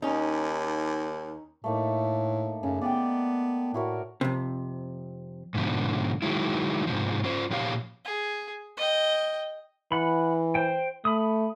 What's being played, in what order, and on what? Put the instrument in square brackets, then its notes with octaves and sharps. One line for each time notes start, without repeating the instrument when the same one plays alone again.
[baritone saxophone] D#2 [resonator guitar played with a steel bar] C#4 D#4
[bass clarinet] A2 [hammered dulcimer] A3 A#3 D#4
[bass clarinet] F#2 [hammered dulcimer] C#3
[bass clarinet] B3 [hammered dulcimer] D5 G5
[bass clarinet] A2 [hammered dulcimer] E4 F#4 A#4
[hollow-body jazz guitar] F2 C3
[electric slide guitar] G#2 B2 D3 F3
D#3 E3 F#3 G#3 E4
G#2 C3 F3
C#4 F4 C5
A#2 F3 G4 C#5 F5
[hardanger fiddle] G#4
D#5 G5
[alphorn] E3 [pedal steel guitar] F#5 B5
[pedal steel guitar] C5 G5
[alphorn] A3 [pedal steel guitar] B5 D#6